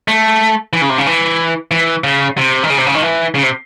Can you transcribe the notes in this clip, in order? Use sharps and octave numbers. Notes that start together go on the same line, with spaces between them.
A3
E3
C#3
C3
C#3
E3
E3
C#3
C3
D#3
C#3
C3
C#3
D#3
E3
C#3
C3